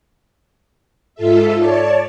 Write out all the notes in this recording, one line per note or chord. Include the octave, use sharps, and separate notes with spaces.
G#2 F4 A4 E5
C#5 D5 A5